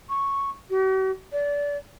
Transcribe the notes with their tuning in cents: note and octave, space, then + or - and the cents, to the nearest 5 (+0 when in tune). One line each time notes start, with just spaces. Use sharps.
C#6 -5
F#4 +45
D5 -25